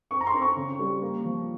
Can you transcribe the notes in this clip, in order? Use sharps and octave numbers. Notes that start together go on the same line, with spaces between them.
C4 C#6
A#5
C6
C4
C#6
C#3
G3
A#3
F3